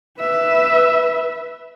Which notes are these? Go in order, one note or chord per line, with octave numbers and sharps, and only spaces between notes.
B4 E5